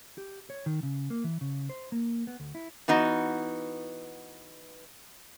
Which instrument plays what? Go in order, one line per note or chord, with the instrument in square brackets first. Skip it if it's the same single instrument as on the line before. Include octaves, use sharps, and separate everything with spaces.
[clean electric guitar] G4
C#5
D#3
C#3
A#3
E3
C#3
C5
A#3
B3
D2
E4
[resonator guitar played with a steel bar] E3 B3 D#4 F#4